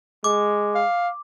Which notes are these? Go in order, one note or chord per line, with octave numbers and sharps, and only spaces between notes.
G#3 D6
F5